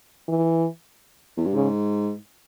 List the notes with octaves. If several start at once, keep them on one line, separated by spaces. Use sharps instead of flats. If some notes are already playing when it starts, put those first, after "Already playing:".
E3
E2
G2
G#2 C#3